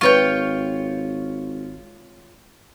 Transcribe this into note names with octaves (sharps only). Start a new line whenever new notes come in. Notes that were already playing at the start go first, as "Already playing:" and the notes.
G#1 F4 B4 C#5 G5 C#6